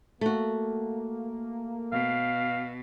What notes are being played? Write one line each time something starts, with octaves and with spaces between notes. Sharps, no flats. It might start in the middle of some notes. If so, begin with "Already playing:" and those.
A3 A#3 F#4
B2 F5